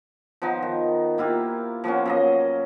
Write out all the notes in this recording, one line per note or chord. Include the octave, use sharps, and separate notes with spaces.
F3 B3 D#4 A#5
D#3
A#3 E4 F4 G4
F3 A#3 B3 C#4
F#2 A#3 D#5